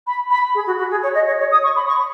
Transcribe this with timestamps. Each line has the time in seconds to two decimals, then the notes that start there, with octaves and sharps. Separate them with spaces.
0.07 B5
0.31 B5
0.55 G#4
0.67 F#4
0.78 F#4
0.91 G#4
1.03 C#5
1.15 D#5
1.27 C#5
1.40 C#5
1.51 D#6
1.64 C#6
1.76 B5
1.87 C#6